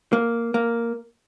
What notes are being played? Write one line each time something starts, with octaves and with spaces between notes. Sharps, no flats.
A#3
A#3